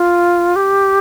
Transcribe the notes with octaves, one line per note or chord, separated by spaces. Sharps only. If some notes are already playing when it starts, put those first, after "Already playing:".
Already playing: F4
G4